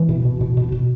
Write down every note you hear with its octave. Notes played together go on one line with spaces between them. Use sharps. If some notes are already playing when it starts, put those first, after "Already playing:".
Already playing: E3
B2
B2
B2
B2
B2